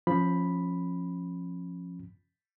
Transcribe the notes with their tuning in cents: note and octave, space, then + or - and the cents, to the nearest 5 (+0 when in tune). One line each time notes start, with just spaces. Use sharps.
F3 +0 C#4 -25 B5 +0